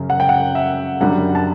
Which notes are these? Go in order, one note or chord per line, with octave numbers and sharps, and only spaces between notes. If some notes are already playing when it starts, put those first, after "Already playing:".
Already playing: F#2 C#3
F#5
G5
F#5
E5
F#2 D3 G3 F#5
A5